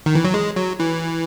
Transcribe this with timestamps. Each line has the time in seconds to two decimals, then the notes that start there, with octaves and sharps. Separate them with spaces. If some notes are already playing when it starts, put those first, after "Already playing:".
0.06 D#3
0.15 E3
0.24 F#3
0.34 G#3
0.56 F#3
0.80 E3